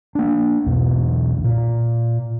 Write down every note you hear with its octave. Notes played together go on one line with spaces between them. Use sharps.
A#3 D4
B1 E2 B2
A#2